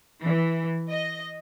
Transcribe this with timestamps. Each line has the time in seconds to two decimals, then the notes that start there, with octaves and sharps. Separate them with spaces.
0.23 E3
0.89 D#5